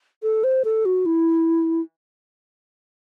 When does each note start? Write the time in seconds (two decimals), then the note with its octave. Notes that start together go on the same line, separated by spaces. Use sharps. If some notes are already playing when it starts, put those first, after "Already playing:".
0.23 A4
0.44 C5
0.64 A4
0.85 F#4
1.06 E4